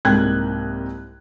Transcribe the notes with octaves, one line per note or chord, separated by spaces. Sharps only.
C2 G#2 A#3 G5 F#6 G#6